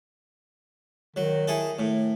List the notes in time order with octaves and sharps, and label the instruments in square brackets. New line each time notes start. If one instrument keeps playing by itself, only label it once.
[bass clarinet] D#3 [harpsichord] F#3
[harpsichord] E4 G#4 A4
A2